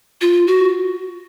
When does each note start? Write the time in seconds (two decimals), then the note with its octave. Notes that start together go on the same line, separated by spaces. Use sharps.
0.21 F4
0.47 F#4